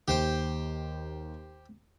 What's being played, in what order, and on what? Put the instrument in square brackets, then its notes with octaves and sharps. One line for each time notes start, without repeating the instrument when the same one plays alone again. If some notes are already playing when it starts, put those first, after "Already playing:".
[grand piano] D#2 G7 [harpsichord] G4 C5 G5